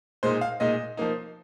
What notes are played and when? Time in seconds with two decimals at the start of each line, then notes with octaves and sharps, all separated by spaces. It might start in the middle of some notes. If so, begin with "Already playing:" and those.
0.23 A#2 G#3 D#4 C5
0.41 F5
0.60 A#2 G#3 D#4 D#5
0.97 F3 A#3 D#4